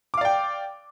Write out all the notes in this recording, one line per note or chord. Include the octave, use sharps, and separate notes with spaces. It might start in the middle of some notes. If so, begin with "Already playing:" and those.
D5 F5 G5 D6